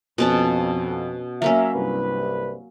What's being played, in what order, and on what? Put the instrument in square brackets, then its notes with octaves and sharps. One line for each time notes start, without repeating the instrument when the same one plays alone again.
[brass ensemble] F2 [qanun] B2 C#4 A5
[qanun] F#3 A#3 C#4 [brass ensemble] E5
[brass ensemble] C2 G2 B4